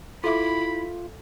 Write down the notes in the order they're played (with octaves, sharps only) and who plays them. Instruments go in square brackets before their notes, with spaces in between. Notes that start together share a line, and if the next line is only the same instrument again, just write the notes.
[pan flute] E4 [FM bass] F4 [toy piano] A4 E5 D6 [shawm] B5